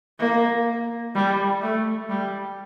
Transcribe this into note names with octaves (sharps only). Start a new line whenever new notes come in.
A#3
G3
A3
G3